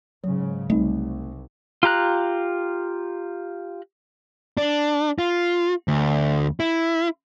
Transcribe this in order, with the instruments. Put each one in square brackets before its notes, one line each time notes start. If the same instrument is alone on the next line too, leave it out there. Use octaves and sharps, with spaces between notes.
[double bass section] G#2 C#3 [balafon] F#3
[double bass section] C2 [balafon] G3 D#4 [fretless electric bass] A3 C4
[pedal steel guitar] F4 G4 A#5 F#6
[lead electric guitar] D4
F4
D2
E4